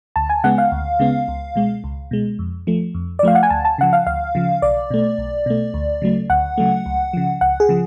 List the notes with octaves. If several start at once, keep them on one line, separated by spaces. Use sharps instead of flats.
D2 A5
G#5
C#3 G#3 B3 F#5
F5
D2
C#3 G#3 B3
C#2
B2 G#3
C#2
B2 G#3
F2
F3 A3
F2
D5
F3 A3 F5
F#5
G#5
D2 A5
A5
C#3 F3 F#5
F5
D2 F5
C#3 F3
B1 D5
B2 A3
B1
B2 A3
D2
C#3 F#3 A3
D2 F#5
C#3 F#3 A3
C#2
C#3 F3
C#2 F#5
G#4
C#3 F3